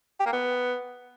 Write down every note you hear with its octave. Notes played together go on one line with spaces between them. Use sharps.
G4
A#3
B3